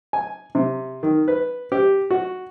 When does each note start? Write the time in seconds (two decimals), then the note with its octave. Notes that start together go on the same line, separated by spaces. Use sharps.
0.13 G#5
0.55 C3
1.03 D#3
1.28 B4
1.72 G4
2.10 F#4